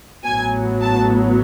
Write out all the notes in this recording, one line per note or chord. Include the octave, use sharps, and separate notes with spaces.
A1 A2 F#3 B3 G#5
A5